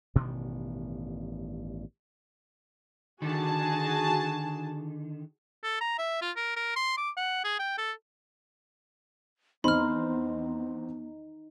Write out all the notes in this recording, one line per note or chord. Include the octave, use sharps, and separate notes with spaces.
A1 G2 B2 D#3
D3 D#3 F#4 G#4 A5
A4
A#5
E5
F4
A#4
A#4
C6
D6
F#5
G#4
G5
A4
E2 B3 C4 D#4 B5 C6 F6